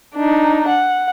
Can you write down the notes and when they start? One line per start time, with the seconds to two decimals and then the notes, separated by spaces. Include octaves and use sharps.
0.15 D4 D#4
0.68 F#5